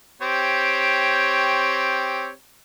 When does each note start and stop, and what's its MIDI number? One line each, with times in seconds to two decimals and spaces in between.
0.21 2.31 60
0.21 2.31 67
0.21 2.31 73